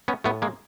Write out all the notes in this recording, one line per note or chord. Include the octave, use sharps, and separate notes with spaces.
B3 C#4
A2 A3 B3
G#3 A#3